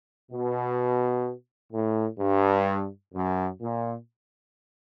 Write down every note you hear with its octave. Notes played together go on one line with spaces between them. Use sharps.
B2
A2
G2
F#2
A#2